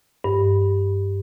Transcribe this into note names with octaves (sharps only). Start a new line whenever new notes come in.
G2